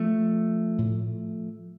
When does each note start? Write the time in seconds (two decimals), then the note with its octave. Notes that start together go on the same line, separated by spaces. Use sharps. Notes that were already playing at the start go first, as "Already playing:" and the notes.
Already playing: F3 A3
0.78 A2